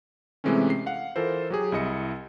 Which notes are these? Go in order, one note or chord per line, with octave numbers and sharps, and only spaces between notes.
C3 E3 G#3 A3 C4 C#4
C7
F5 F#5
E3 F4 A4 A#4 C5
F#3 G4 G#4
C2 E4 D#5 C#7